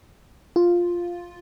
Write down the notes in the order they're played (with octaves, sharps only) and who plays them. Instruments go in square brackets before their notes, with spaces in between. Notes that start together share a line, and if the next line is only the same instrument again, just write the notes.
[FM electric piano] F4